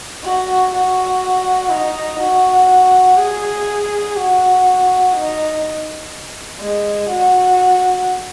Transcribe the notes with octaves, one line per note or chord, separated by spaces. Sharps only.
F#4
F#4
D#4
F#4
G#4
F#4
D#4
G#3
F#4